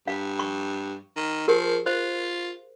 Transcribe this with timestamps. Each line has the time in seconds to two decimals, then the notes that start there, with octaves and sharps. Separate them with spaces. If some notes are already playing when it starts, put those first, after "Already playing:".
0.08 G2 F5
0.39 C#6
1.16 D#3
1.48 F3 G4 G#4 A#4
1.86 F4 C5